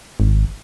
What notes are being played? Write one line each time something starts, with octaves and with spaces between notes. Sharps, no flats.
G#1